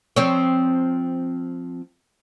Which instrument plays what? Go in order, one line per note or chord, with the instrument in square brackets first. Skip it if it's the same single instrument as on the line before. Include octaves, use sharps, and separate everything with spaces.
[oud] F3 C4 C#5